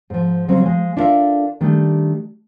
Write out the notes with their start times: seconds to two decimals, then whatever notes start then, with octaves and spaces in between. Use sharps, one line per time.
0.10 G#2 F3
0.48 C#3 F#3 G3 C4 C#4
0.64 F3 G#3
0.97 D4 E4 F4 A4 A#4 E5
1.61 D#3 G3 A3 D4 G4